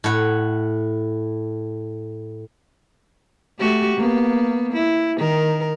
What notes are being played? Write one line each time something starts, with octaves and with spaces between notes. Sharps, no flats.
A2 F#5
A3 F#4 G4
A#3 B3
E4
D#3 A#4